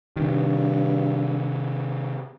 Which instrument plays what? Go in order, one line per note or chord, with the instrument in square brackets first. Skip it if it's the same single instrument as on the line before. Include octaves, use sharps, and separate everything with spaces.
[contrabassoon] G2 [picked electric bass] C3 D#3